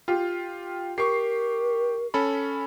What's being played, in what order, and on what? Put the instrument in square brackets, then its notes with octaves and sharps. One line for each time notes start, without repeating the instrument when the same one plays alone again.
[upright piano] F4 G4
[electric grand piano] G4 [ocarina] A#4 [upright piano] C#6 C7
[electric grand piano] C#4 A4 B5